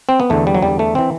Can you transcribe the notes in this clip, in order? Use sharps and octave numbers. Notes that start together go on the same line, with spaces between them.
C4
B3
E2 D3 A3
G3
F#3
E2 G3
D3
A3
E3 C4